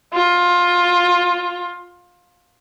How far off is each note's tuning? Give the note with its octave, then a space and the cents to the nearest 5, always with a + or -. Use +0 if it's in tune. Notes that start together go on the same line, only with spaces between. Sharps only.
F4 +15